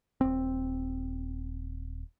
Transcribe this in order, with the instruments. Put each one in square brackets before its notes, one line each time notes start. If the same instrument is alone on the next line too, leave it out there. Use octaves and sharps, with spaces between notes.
[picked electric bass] D#1 C4